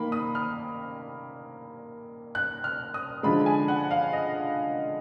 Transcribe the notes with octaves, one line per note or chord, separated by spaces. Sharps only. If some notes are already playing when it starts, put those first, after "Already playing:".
Already playing: D#3 A#3 B5
D#6
F6
F#6
F6
D#6
D3 F3 G#3 B5
G#5
F#5
F5
D#5